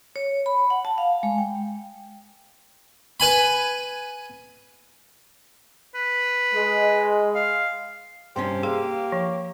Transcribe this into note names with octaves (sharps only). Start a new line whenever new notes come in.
C#5
B5
F#5
A5
F5
G#3
G5
B4 G#5 B5
B4
G#3
F5
G2 C3 C#4 G4 C5
A#3 G#4 F5
F3